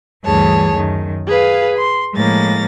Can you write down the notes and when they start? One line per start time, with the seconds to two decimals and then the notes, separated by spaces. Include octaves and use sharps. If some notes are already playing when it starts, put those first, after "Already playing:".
0.25 D2 G2 E3 G#4 C#5 A5
0.76 F#2 D#3
1.26 G#4 B4 F5
1.77 C6
2.15 A2 F3 G#3 A#3 A6 A#6